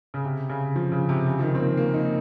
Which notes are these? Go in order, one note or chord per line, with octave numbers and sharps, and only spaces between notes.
C#3
C3
C#3
F3
C#3
C3
C#3
F3
D#3
C4
A#3
A#3
D#4